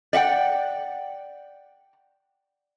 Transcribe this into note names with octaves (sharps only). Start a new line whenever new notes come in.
D5 E5 F#5 G5